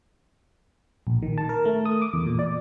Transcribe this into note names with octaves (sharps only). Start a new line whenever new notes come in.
A#1
D#3
A5
A#4
A3
D#6
D6
E2
A#2
D5